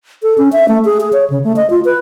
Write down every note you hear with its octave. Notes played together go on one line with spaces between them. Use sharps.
A4
C#4
E5
A3
G#4
G#4
C#5
C#3
A3
D#5
F4
B4